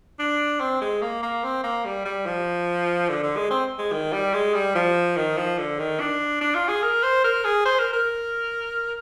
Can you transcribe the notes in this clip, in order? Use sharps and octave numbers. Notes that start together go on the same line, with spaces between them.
D4
C4
G#3
A#3
A#3
C4
A#3
G3
G3
F3
D3
D3
G#3
C4
G#3
D#3
G3
G#3
G3
F3
D#3
F3
D3
D#3
D4
D4
F4
G#4
A#4
C5
A#4
G#4
C5
A#4
A#4